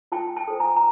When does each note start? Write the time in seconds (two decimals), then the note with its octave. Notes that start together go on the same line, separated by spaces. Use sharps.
0.12 F4 G5 A5
0.37 G5 A5
0.48 A4 C5
0.60 G#5 A#5
0.76 A#5